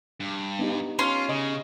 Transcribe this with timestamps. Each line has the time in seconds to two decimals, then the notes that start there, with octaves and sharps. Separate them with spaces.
0.20 G2
0.59 B3 D#4 G4
0.99 C#4 F4 C6
1.29 C#3 D#5